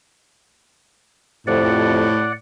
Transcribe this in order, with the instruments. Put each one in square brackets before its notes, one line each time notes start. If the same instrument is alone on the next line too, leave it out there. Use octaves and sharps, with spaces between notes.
[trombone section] F2 [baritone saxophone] A2 [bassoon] C3 [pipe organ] D5 F#5